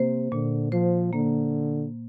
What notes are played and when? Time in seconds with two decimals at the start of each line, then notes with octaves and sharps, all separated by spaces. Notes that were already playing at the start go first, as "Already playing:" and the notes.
Already playing: C3 A#3 C5
0.32 A#2 D3
0.72 F3 C5
1.13 D3 A#3